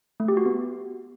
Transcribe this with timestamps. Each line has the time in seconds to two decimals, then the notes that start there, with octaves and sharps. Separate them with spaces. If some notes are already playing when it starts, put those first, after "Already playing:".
0.20 A3
0.28 G4
0.37 F#4
0.46 B3